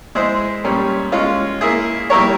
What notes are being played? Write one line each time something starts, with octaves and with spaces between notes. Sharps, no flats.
G#3 E4 G#4 C5
A#2 G3 C#4
G#3 C#4 F4
A#3 E4 G#4
G3 A#3 E4 A#4 C#5